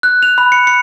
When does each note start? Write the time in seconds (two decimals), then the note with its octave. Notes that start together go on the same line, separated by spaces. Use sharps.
0.03 F#6
0.23 F7
0.38 B5
0.52 C#7
0.67 C#7